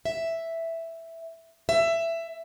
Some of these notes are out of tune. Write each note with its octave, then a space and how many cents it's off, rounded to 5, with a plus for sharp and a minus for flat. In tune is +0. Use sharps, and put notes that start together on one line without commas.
E5 +0
E5 +15